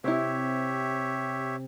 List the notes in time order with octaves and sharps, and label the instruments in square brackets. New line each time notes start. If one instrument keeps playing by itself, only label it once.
[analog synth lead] C3 [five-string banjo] C4 E4 [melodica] G4 C#5 E5